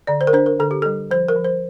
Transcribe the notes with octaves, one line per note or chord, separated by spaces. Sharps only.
D3 D5
C5
A#4
D4 C5
A#4
D3 A4
G4
G3 A4
F3 C5
A#4
F3
C5